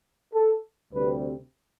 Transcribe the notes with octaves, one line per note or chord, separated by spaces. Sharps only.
A4
D2 C3 G3 C4 B4